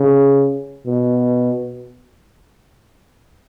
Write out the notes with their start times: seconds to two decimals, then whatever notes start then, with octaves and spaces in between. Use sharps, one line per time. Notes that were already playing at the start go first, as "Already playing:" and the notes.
Already playing: C#3
0.86 B2